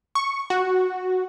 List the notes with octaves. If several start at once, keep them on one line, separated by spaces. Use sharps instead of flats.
C#6
F#4